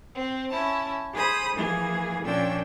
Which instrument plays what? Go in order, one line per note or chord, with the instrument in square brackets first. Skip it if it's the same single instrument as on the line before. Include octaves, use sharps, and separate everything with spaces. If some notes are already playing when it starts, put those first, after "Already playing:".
[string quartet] C4
C#4 E4 A5
G#4 C5 B5 D#6
E3 F3 A#3 G#4
A#2 F3 C#4 D4 G5 E6